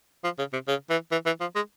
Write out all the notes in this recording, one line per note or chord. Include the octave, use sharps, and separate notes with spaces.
F3
C#3
C3
C#3
E3
E3
E3
F3
G#3